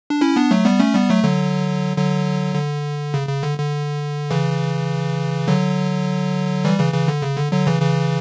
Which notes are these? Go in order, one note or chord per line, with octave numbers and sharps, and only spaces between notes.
D4
C#4 E4
B3 D4
F#3 A3
G3 B3
A3 C#4
G3 B3
F#3 A3
D3 F#3
D3 F#3
D3
C#3
C#3
D3
D3
C#3 E3
D3 F#3
E3 G3
C#3 E3
C#3 E3
D3
C#3
D3
D3 F#3
C#3 E3
C#3 E3